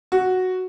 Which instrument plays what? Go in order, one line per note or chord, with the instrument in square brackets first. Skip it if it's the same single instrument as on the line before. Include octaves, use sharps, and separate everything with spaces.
[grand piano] F#4